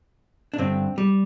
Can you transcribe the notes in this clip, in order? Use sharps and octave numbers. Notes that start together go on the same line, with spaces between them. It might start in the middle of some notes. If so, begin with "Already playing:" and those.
D4
G2 D3 C4
G3